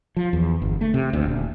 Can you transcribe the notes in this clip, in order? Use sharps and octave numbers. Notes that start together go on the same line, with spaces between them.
F3
E2
G1
A3
C3
D2
D#1